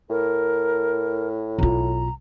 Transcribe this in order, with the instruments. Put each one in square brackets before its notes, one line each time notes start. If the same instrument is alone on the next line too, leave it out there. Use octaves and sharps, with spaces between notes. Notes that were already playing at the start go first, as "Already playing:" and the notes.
[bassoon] A2 [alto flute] A#4
[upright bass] B1 F4 [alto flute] A#5